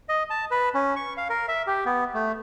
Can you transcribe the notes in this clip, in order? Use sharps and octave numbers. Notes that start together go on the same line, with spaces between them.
D#5
A5
B4
C#4
C#6
F5
A#4
E5
G4
B3
A3